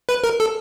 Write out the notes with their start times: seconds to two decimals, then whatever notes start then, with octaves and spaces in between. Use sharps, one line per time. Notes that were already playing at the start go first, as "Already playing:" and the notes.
0.09 B4
0.24 A#4
0.40 A4